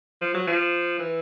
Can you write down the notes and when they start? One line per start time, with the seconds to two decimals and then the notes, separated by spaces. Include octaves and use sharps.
0.21 F3
0.34 F#3
0.47 F3
0.99 E3